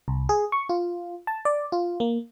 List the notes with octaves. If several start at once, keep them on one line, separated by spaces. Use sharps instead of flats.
C2
G#4
C#6
F4
A5
D5
F4
A#3